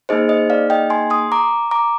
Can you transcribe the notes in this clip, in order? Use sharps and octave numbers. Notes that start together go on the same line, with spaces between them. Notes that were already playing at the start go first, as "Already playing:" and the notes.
A#3 D#4 G#4 C5 D#5
C5 D#5
D5 F5
D#5 G5
G#5 C6
C6 D#6
A#5 D6
A#5 D6